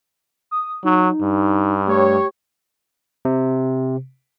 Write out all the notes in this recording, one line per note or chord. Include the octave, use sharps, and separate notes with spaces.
D#6
F#3 D#4
G2
A3 G4 C#5
C3